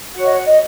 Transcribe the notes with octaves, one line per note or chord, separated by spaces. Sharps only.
F#4 C#5 F#5
D#5
F#5
D#5